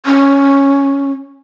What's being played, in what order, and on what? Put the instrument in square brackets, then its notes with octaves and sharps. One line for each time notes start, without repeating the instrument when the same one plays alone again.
[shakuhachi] C#4